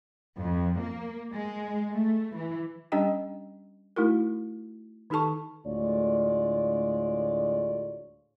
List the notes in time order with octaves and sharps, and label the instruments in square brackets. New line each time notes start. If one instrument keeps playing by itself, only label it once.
[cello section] F2
A#3
G#3
A3
E3
[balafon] G3 C#4 D4 G4 D#5 G5
A3 D#4 E4 F#4 A#4
D#3 D#4 G4 A4 A5 C#6
[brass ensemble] D2 A2 G#3 F4 C#5 D5